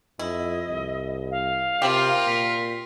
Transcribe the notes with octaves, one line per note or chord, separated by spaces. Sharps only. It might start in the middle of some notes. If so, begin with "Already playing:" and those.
F2 E4 D#5
C2
F5
C3 F4 G4 A#4
A#2 B6